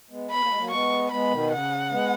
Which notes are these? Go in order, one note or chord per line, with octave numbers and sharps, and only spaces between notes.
G#3 B3
B3 B5
A#3
G#3
F#3 A#3
G#3 B3 C#6
G#3 B3 B5
B2 D#3
C#3 F#5
G#3 B3